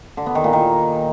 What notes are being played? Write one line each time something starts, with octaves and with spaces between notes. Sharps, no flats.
D3
B3
D#3
A#2
D#3